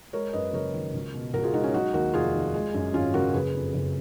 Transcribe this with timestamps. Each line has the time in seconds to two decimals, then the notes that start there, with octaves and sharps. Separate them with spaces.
0.13 G#3 A#4 C#5
0.33 F#2 B4 D#5
0.53 F#1 A#4 C#5
0.74 D#3
0.93 C#2
1.14 B2
1.33 C#2 F#4 A#4
1.43 F4 G#4
1.54 G#3 D#4 F#4
1.64 C#4 F4
1.74 F#3 D#4 F#4
1.94 D#2 F#4 A#4
2.14 F1 F4 G#4
2.34 D#3
2.54 G#3
2.74 F#2
2.94 G#1 C#4 F4
3.14 C#3 F#4 A#4
3.34 F#1 G#4 B4
3.55 F2
3.74 F#1